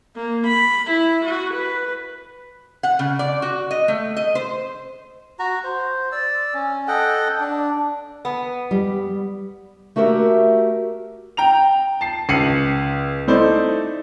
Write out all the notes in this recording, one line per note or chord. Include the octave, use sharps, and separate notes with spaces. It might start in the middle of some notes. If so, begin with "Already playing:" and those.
A#3
B5
E4
F#4
B4
F#5
C#3
D5
F#4
D#5
A3
D#5
C5
F#4 A#5
C5
D5 E6
C#4
A4 D#5 F#5 G5
D4
B3
G3
A3 F#4 G4 A#4 E5
G5 A#5 F7
A5 C7
C#2 C7 C#7 D#7 F#7
A3 D#4 E4 C5 D5